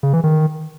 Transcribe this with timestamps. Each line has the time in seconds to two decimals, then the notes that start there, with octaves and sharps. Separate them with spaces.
0.03 C#3
0.13 E3
0.24 D#3